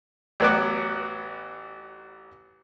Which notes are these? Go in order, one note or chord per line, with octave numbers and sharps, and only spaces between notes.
A1 F#3 B3 F#4 D6